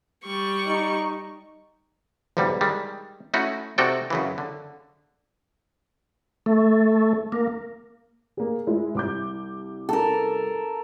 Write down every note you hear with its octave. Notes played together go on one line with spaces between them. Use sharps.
G3 C#6
D#4
B1 E2 G#2 D3 G3
D#3 G3 G#3
A3 C#4 D#4 E4 F#4
C3 D#4 F#4 A4 D5 G5
F#2 C#3 E3
D3
A3
A#3
A#3 G#4
G#3 E4
C2 D6 G6
A4 A#4